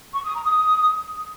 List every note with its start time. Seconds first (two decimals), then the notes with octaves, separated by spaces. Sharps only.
0.14 C#6
0.24 D#6
0.35 A#5
0.45 D#6